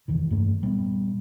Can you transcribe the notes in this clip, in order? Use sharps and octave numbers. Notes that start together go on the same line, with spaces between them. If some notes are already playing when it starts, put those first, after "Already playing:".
F1 D#2 D#3 E3
G2 A3 A#3 C#4
A#2 G3 A#3 B3